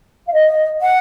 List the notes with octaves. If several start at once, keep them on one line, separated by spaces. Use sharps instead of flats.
F5
D#5
F#5